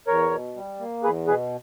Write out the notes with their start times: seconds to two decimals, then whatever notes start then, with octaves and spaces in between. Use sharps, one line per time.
0.07 E2 A#4 C#5
0.31 B2
0.55 G3
0.80 A#3
1.03 E2 G#4 B4
1.27 B2 G#4 B4